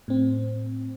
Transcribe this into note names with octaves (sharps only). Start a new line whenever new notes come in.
A2 C4